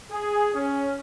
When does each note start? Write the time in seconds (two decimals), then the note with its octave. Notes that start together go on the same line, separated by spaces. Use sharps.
0.11 G#4
0.54 C#4